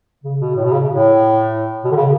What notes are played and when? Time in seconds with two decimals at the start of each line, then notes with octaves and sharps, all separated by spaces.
0.24 C#3
0.40 B2
0.56 A2
0.64 B2
0.72 C#3
0.89 A2
1.84 B2
1.91 D3
1.96 C#3